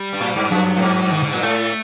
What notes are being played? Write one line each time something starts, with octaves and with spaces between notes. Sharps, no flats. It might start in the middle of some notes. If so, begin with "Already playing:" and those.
Already playing: G3
G2
A2
G2
F#2 F#3
A2
G2
D#3
D3
A#2 F#3
A2 A3